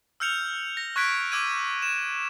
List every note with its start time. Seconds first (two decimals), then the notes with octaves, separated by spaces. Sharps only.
0.20 E6 F6 G6 C#7 F7
0.77 A#6
0.96 C#6 F#6 G#6 B6 D7
1.32 D6 E6 G#6 D#7
1.82 E7